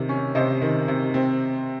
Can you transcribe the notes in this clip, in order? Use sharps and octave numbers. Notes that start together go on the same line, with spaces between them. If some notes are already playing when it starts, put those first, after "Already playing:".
Already playing: C3 D#3
C#4
C3 C5 D#5
D#3
C3
C4